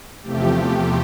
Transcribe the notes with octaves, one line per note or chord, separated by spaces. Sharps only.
E2 C3 F3 A3 G4